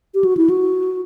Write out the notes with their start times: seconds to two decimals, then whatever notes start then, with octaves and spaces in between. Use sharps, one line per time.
0.14 G4
0.25 F#4
0.37 E4
0.50 F#4